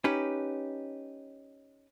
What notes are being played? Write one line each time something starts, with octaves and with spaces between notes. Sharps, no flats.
C#4 D#4 G4 B4